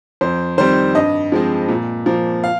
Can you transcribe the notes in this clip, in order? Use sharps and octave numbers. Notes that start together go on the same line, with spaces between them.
F2 C5
D#3 G3 C4 C5
G2 D#5
F3 G#3 C4
A#2
F3 A#3
F5